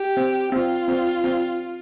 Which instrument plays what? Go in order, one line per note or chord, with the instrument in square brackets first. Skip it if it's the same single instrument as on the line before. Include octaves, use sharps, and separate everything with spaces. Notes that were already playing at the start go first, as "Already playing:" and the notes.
Already playing: [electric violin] G4
[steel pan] C4
[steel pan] C4 [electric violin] F4
[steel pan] C4
C4